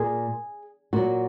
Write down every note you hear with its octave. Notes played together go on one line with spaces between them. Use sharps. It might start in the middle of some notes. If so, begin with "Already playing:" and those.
Already playing: A#2 G#4
A#2 F#3 F#4